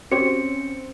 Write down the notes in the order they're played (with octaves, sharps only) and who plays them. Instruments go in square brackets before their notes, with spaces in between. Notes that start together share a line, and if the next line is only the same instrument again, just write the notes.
[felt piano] C4 [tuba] C#4 [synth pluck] F#4 G4 C#5 [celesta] C#7